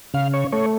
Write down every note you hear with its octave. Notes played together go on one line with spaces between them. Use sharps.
C#3 F5
C#5
A3 C#5